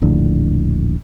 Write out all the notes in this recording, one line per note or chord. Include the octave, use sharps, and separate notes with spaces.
D#1 A#1 A2 D3